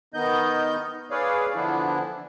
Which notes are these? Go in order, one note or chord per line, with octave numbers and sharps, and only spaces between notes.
D#3 B3 D#4 D#5 G6
G#4 B4 C#5 D5 F5
D3 E3 F3 B3 D4 E4